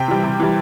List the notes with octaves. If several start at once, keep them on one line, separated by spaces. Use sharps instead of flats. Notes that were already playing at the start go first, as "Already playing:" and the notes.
Already playing: C3 G5
E3 G3
C3
E3 G3